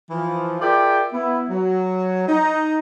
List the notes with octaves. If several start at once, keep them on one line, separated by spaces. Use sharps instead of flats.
E3 F3
F4 G#4 A#4 D5 E5 G5
B3 E4
F#3
D#4